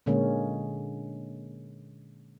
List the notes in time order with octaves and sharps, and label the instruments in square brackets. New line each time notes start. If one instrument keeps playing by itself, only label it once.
[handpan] A#2 D3 G#3 A#3 C#4